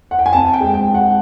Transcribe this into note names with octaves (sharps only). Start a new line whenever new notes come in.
F#5
G5
G#5
C4 A5
G5
G#3
G5
G#3
F#5